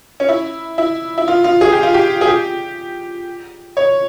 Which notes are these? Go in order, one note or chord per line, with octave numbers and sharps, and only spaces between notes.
C#4
E4
E4
E4
F4
F4
G#4
G4
F4
G4
G#4
G4
C#5